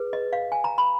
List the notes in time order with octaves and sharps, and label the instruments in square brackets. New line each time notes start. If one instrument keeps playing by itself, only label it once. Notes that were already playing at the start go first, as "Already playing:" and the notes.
Already playing: [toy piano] G#4 B4
D#5
F5
G#5
A#5
B5